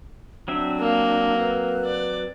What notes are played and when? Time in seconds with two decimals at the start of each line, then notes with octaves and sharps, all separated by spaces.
0.48 F#3 C4 D4 E5
0.80 A#3
1.38 B4
1.85 D5